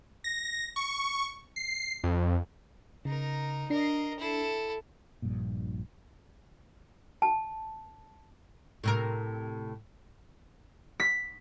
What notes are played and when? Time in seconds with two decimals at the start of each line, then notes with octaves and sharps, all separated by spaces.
0.24 A#6
0.76 C#6
1.56 C7
2.04 F2
3.05 C#3 D#4 A#4
3.70 D4 A#4 D#5 C7
4.19 E4 A4
5.22 A#1 G2 A#2
7.22 A5
8.84 A2 C3 A#4
11.00 B6